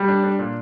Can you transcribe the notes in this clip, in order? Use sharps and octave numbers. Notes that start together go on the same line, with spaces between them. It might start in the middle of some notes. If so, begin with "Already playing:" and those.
Already playing: G3
D4
D4
A#2